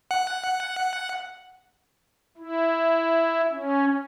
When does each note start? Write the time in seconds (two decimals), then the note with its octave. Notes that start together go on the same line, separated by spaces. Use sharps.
0.11 F#5
2.38 E4
3.51 C#4